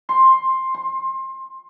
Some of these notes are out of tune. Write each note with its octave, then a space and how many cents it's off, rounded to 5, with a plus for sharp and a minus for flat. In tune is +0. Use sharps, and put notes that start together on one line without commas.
C6 +10
C6 +25